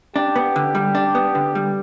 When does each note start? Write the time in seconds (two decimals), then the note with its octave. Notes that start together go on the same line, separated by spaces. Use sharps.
0.16 D4 G4
0.36 B3
0.56 D3
0.75 G3
0.95 D4
1.15 B3
1.35 D3
1.55 G3